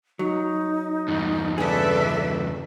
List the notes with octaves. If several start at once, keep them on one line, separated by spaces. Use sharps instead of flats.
F#3 D#4
E2 G2
C#3 G#4 A4 B4 D5 E5